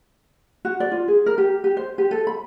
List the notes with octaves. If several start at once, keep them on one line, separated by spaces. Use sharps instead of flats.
F#4
D5
F4
G#4
A#4
G4
G4
C5
G4
A4
B5